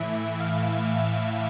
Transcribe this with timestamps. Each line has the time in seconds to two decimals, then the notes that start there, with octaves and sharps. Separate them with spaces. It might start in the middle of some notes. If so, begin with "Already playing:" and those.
Already playing: A2 E3 E5
0.40 F5
1.02 F5